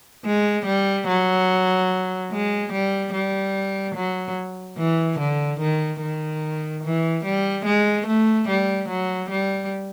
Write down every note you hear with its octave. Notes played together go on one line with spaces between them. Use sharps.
G#3
G3
F#3
G#3
G3
G3
F#3
E3
D3
D#3
D#3
E3
G3
G#3
A3
G3
F#3
G3